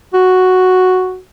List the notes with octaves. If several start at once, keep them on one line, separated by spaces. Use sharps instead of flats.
F#4